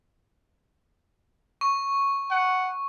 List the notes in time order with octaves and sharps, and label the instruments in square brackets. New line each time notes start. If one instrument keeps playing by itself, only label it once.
[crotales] C#6
[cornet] F#5